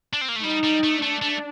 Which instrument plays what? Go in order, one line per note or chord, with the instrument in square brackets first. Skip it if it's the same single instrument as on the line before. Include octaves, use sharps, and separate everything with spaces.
[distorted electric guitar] D4
C4
A#3
A3
[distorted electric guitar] G3 [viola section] D#4
[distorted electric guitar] G3
A3
[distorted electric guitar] A3 [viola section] D4
[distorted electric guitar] A3